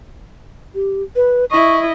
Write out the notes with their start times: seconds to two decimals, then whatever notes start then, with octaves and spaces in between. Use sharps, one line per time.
0.75 G4
1.16 B4
1.51 E4 D#5 C#6